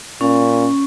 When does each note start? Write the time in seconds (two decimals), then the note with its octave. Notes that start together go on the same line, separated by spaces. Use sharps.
0.21 A#2 C#4